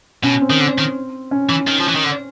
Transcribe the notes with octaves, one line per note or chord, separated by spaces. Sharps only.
B2 C#4
C4
D#3
D3
D#3
C#4
E3
D#3
F3
E3
D#3
D3